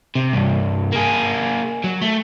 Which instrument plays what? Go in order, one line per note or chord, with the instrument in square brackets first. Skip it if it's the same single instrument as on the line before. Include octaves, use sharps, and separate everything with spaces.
[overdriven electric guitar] C3
C2 G2
A#3 G#4
F#3
A3